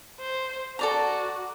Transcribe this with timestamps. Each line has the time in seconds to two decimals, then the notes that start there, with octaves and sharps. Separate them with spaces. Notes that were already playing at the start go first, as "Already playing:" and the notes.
0.20 C5
0.79 F#4 A4 D5 A#5